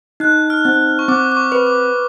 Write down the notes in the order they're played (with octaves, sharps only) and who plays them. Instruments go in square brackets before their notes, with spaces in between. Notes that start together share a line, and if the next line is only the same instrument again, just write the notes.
[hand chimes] D#4 [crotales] F#6
[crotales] F6
[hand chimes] C4
[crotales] C#6
[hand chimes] C4 [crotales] D6
[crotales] D6
C#6
[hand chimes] B4
[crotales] D6